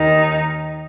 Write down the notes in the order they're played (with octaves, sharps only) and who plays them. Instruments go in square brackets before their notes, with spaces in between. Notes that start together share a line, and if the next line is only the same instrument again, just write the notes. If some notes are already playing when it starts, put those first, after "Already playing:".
Already playing: [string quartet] D#2 D#3 D#4